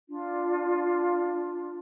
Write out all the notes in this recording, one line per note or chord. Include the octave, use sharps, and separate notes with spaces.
D4 F4